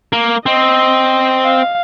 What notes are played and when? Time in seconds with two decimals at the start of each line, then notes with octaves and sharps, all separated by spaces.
0.13 A#3
0.45 C4 D#5
1.44 F5